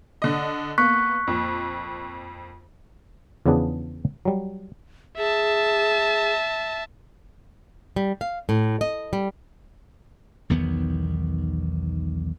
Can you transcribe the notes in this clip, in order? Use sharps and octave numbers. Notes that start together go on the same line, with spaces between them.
D3 D#5
A#3 B3 C#6 F#6 B6
F2 A#2
E2 C#3 F3 B3 D4 G#4
F#3 G3
G#4 E5 A5
G3
F5
A2
D#5
G3
B1 E2 D#3 B3